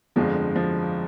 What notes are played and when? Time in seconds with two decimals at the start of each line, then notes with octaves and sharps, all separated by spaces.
0.16 G1 F2 D3 F3 G#3
0.56 F3